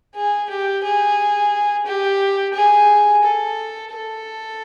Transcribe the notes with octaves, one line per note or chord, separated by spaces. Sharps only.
G#4
G4
G#4
G4
G#4
A4
A4